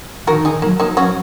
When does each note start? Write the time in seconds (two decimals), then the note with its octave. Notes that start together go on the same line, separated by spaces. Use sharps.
0.27 D#3 F#4 A#4
0.45 D#4 G#4
0.62 F#3 A#3
0.80 A#3 D#4
0.97 C#4 F#4